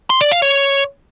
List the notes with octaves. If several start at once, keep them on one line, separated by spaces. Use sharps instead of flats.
C6
D5
F5
C#5